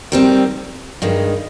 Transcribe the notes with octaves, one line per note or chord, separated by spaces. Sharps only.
D#3 G3 C4
G2 D#3 G#3